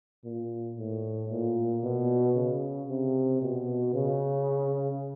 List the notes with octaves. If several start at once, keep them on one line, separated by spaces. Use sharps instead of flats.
A#2
A2
A#2
B2
C#3
C3
B2
C#3